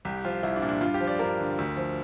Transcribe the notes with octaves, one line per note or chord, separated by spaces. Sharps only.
C2 G4
F3 F4
C2 E4
D4
A#2
D4
G2 F4
G4
F3
D5
G2 A#4
D3
D2
F3